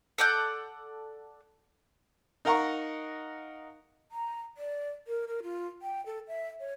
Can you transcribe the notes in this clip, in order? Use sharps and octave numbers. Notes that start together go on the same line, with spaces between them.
A4 D5 F#5 G6
D#4 A#4 F5 F#5 A#5 C#6
A#5
D5
A#4
A#4
F4
G5
A4
E5
C#5